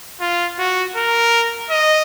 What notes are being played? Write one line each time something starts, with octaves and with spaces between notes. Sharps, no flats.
F4
F#4
A#4
D#5